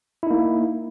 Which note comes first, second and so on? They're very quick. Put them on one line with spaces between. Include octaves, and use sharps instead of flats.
E4 D#4 A#3